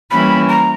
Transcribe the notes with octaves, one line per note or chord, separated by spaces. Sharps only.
E3 G3 A#3 C#4 E4 B5
A#5